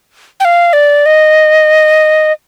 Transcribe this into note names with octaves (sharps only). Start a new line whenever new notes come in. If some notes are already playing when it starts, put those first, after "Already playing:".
G5
F5
D5
D#5